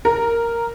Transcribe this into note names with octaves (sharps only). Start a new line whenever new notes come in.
A#4